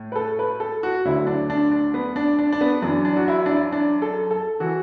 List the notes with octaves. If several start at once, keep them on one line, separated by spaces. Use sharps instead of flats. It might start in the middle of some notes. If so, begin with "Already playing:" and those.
Already playing: A2
B4
A4
B4
A4
F#4
D2 D3 F#3 E4
D4
D4
D4
B3
D4
D4
D4
B3
F#2 E3 D4
D4
F#4
E4
D4
E4
D4
A4
A4
E3 F#4